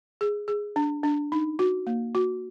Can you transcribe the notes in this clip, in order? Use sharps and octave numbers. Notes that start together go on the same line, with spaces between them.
G#4
G#4
D4
D4
D#4
F#4
A#3
F#4